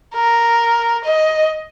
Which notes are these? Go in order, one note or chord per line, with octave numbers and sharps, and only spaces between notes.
A#4
D#5